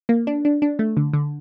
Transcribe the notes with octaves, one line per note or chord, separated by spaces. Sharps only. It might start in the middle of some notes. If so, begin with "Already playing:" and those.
A#3
D4
D4
D4
A3
D3
D3